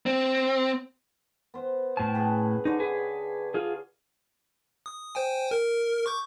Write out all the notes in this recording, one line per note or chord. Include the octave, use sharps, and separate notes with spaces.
C4
B3 C5
A2 C#4 G5 A5
G#4 B4 F#5
D3 D#4 C#5
G#4 B4
F4 G#4
D#6
C5 G5 G#5
A#4
C#6 D6 G6